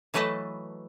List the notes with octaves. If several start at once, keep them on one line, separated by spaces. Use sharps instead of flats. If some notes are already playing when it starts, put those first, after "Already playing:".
E3 F#3 A3 B4 D#5 A5